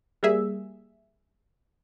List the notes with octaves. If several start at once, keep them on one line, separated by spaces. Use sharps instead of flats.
G3 A#3 G#4 E5